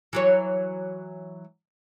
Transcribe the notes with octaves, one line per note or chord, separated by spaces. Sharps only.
E3 F#3 C#5